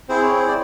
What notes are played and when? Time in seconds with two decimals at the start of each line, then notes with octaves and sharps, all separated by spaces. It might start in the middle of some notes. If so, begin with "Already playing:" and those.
0.09 C4 E4 G#4 C5
0.23 C#5
0.36 C5
0.48 D5